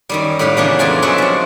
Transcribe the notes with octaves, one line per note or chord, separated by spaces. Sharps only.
F#2 D#3 G3
A2 G3 G4 B4 F5
C#3 E3 A#3 B3 D4
F2 E3 F3 D5 F5 G#5
F#3 G#3 C#4 F#4 D5 E5
C3 F3